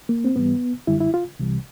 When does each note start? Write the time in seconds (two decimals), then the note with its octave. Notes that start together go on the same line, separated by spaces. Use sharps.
0.09 A#3
0.25 C4
0.36 G#2 E3 G3 B3
0.87 F#2 D3 G3 E4
1.00 E4
1.14 F4
1.39 C2 C3 E3 G3